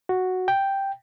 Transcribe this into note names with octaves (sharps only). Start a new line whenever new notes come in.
F#4
G5